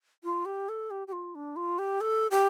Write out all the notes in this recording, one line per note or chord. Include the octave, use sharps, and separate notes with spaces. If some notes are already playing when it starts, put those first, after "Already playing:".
F4
G4
A4
G4
G4
F4
D4
F4
G4
A4
G4